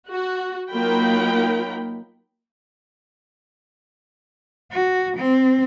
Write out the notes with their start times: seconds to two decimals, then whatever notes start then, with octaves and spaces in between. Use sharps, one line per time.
0.10 F#4
0.71 F#3 A#3 D#4 F4 G5 B5
4.72 F#4
5.17 C4